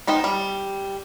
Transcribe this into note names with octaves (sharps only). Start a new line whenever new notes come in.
B3 D#4 C5 G5
G3